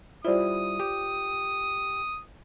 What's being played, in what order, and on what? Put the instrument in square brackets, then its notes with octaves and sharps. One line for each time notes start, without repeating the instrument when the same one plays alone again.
[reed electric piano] G3 E4 [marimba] F4 C5 D5 [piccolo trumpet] D#6
[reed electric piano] G4 G5